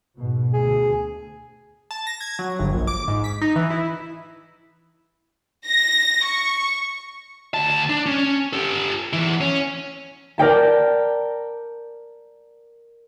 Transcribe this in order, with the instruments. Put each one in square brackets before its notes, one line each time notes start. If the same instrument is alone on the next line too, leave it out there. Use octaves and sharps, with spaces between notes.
[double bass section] G#2 B2
[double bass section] D2 [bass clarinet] G#4
[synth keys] A5
A#6
G#6
F#3
G1
A#1
D6
G#2
B6
D#4
E3
E4
[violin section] A#6
C#6
[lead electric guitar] D2 A5
D4
C#4
G4 A4
E2 E3
C#4
[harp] A#4 D5 G5 A5